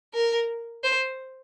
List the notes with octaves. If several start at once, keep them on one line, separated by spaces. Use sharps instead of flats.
A#4
C5